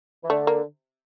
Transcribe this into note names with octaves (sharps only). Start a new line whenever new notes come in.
E3
D3 A3
A#3